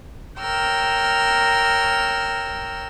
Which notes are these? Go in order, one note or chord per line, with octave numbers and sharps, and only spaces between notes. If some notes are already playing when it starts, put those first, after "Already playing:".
A#4 C#5 G5 E6 F6